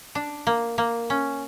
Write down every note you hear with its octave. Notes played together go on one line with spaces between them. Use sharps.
D4
A#3
A#3
C#4